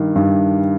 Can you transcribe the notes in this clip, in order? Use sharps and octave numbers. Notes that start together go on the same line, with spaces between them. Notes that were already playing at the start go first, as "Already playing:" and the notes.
Already playing: G2 D#3
G2